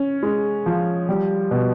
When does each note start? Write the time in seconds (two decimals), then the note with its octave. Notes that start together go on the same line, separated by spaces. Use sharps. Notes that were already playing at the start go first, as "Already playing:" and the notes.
Already playing: C#4
0.23 G#3
0.66 F3
1.09 G3
1.51 B2